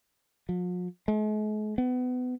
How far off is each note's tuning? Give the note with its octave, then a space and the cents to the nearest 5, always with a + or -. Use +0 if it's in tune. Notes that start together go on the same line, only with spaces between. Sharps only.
F3 +45
G#3 +45
B3 +25